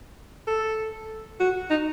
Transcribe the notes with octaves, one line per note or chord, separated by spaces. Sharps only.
A4
F#4
D#4